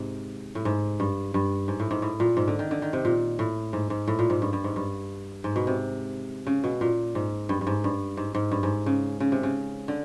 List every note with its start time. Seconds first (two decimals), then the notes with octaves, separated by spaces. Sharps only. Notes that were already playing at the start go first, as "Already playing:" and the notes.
Already playing: G#2 C3
0.55 A2
0.65 G#2
1.00 G2
1.34 G2
1.68 G#2
1.80 A2
1.91 G#2
2.02 A2
2.20 A#2
2.37 G#2
2.48 D3
2.59 D#3
2.71 D3
2.82 D#3
2.93 C3
3.05 A#2
3.39 A2
3.73 G#2
3.90 G#2
4.08 A2
4.19 A#2
4.30 G#2
4.42 G2
4.53 G2
4.64 G#2
4.76 G2
5.44 G#2
5.56 B2
5.67 C3
6.47 C#3
6.64 B2
6.81 A#2
7.15 G#2
7.49 G2
7.61 G2
7.67 G#2
7.84 G2
8.17 G#2
8.35 G#2
8.52 G2
8.63 G#2
8.86 C#3
9.20 C#3
9.32 C3
9.43 C#3
9.88 D3